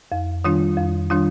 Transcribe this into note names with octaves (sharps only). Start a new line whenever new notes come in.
F2
D#3 G3 D4 F4
F2
D#3 G3 D4 F4